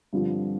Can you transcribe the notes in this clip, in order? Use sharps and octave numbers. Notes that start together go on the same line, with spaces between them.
G2 D3 F3 C4 F4